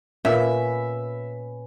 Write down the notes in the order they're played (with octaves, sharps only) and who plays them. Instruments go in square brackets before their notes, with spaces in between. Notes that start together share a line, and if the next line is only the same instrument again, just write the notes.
[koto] A#2 [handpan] C#4 B4 [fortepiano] E5